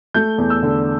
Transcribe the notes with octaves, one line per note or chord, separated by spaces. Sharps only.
A3 G6
E2
E6
D3